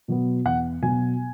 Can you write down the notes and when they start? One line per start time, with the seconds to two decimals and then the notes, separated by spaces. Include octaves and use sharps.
0.08 B2 F#3 B3
0.45 E2 F#5
0.82 B2 F#3 B3 G#5